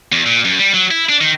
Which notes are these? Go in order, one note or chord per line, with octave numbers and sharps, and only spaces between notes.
E2
A#2
F#2
G3
F#3
E4
D4
D#3